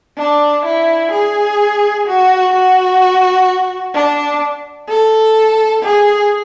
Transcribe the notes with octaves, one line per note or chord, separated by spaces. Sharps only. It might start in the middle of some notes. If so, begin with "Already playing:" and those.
D4
E4
G#4
F#4
F#4
D4
A4
G#4